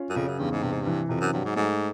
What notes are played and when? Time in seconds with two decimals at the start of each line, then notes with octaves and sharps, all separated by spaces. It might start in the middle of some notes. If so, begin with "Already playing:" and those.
Already playing: C#4 F4
0.09 F#2
0.16 F2 C#3
0.28 F#2
0.39 E2 G2
0.51 G#2
0.63 G2 C3
0.72 G#2
0.82 G2 E3
1.09 F2 C3
1.21 F#2
1.33 G2 F#3
1.45 G#2
1.56 G#2 A3